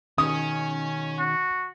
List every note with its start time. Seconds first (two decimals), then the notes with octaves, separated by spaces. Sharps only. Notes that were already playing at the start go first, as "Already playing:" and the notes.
0.18 B2 D#3 G#3 C#4 D#6
1.19 F#4